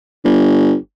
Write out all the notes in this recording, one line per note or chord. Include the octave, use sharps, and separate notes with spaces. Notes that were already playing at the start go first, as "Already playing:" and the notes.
G1